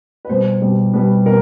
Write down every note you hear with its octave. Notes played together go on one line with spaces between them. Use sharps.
B4
B2 G3 C5
B2 G3
B2 G3 B4
B2 A#4